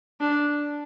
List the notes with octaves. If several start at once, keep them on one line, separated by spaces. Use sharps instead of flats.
D4